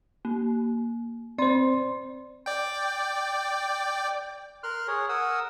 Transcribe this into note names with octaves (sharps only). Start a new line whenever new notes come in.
A#3
C4 C5 D5 C6
D5 G5
A#4 C6 F6 F#6
G#4 C#5
A#4 F#5 D#6 E6